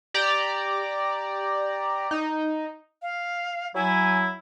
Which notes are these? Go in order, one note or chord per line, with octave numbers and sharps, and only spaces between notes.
G4 D5 A#5
D#4
F5
F#3 E4 G#5